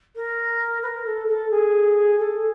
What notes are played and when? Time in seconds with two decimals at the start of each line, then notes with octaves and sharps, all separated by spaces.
0.15 A#4
0.82 B4
0.87 A#4
1.06 A4
1.28 A4
1.51 G#4
2.19 A4